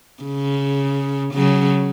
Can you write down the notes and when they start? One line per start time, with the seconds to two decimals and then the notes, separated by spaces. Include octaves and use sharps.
0.23 C#3
1.34 C#3 F#3